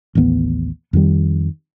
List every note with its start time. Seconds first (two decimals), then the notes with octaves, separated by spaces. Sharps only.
0.15 A1 D#2 A3 B3
0.93 F2 D#3 G3